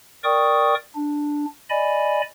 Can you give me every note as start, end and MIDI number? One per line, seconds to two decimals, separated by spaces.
0.24 0.75 70
0.24 0.75 74
0.24 0.75 79
0.24 0.75 85
0.24 0.75 87
0.95 1.46 62
1.70 2.22 74
1.70 2.22 75
1.70 2.22 80
1.70 2.22 83